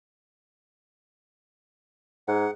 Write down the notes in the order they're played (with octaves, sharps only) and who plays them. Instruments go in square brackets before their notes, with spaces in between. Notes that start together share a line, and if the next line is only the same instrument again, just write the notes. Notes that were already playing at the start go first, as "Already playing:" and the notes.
[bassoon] G#2 [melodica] F#5